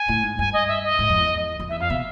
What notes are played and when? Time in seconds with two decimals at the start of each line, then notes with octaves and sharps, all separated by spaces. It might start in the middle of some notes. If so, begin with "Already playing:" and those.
Already playing: G#5
0.09 A2
0.23 G#2
0.39 G2 G#5
0.53 D#5
0.68 E5
0.84 D#5
0.99 G#2
1.09 F2
1.20 E2
1.60 F2
1.69 E2 E5
1.80 F2 F5
1.90 B2 E5